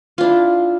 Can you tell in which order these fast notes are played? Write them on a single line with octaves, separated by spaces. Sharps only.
F4 D4 E4